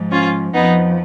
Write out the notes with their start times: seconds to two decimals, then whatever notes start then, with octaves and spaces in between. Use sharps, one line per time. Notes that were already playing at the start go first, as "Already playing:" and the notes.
Already playing: G#2 F3
0.11 C#4 F4
0.54 F2 F3 B3 D#4